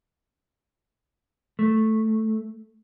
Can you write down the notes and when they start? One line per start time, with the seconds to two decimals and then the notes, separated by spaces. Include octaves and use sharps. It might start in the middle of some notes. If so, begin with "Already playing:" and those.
1.59 A3